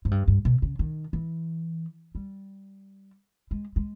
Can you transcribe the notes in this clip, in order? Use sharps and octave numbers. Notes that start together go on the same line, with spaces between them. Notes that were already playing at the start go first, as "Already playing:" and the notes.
G#2
G2
G2
B2
C#3
D#3
E3
G3
G#3
G#3